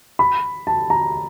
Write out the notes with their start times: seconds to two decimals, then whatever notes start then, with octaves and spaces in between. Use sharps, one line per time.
0.19 B5
0.67 A5
0.90 A#5